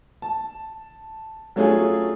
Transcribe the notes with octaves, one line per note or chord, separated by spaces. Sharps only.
A5
F#3 A3 C#4 D4 F4 G#4